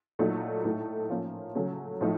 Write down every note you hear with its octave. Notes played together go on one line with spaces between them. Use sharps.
A#2 F#3 A3 D#4
A2 A3 D#4
F3 A#3 C#4
C#3 F#3 A3 C#4
A2 F3 A3 D#4